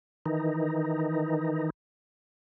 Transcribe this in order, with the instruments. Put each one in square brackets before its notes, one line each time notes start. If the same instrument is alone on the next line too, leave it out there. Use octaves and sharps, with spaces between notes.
[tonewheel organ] D#3 E3 D#4